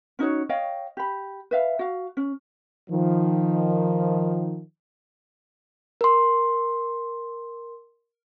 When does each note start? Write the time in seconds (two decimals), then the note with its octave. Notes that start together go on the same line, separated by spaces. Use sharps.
0.19 C#4 D#4 F#4 C#5
0.49 C#5 D#5 F5 G5
0.97 G4 B5
1.51 B4 E5 F5
1.79 F#4 F5
2.17 C#4
2.90 D#3 F3
6.01 A#4 C6